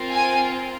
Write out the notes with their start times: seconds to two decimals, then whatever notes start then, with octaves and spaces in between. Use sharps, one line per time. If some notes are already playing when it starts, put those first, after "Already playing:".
Already playing: C4 F4 A#4
0.12 G#5